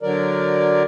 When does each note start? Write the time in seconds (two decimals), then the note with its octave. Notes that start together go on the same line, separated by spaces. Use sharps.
0.03 D3 F#3 A#4 D5